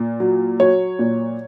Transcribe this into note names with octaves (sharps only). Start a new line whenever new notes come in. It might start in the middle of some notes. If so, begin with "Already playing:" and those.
Already playing: A#2
F#3
F#3 C#5
A#2